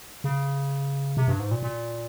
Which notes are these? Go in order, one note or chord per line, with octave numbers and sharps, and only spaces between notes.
C#3
C3
G2
G#2
A#2
A#2